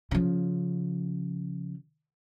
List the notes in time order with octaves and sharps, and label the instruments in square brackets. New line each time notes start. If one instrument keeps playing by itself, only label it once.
[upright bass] C#3 F3